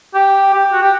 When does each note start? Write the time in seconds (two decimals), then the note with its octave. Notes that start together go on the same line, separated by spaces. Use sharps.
0.14 G4
0.53 G4
0.73 F#4
0.82 G4